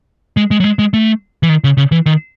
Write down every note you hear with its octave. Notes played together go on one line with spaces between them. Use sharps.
G#3
G#3
F#3
G#3
G#3
A3
E3
D#3
C#3
C#3
E3
D#3